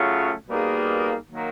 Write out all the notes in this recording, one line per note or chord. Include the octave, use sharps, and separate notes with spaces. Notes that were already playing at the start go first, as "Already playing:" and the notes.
Already playing: C#3 F#3 A3 C#4 F4
B2 G3 A#3 D#4 G#4
D#3 F#3 A#3